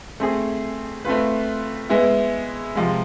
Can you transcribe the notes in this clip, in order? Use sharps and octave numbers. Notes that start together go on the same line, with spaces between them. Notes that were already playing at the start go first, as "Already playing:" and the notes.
A3 C4 G#4
A3 C4 F4 B4
G#3 B3 E4
C3 F3 G#3